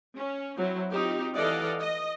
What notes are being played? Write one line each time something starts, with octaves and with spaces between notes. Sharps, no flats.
C#4
F#3 C4 E4
C4 D#4 F4 G4
E3 A4 D5 D#5 F5 F#5
D#5